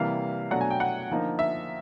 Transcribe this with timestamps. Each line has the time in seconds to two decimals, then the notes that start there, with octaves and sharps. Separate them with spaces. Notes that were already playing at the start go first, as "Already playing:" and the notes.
Already playing: C3 E3 G3 A#3 F5
0.51 B2 F#3 A3 D4 F#5
0.61 G#5
0.70 G5
0.80 F#5
1.10 D3 F3 A#3 D#4
1.39 E5